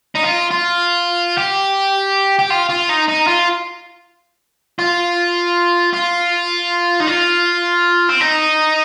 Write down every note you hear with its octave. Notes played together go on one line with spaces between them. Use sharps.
D#4
F4
F4
G4
G4
F4
F4
D#4
D#4
F4
F4
F4
D#4
F4
C4
D#4